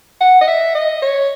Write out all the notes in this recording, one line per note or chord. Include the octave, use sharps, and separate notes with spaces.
F#5
D#5
E5
D#5
C#5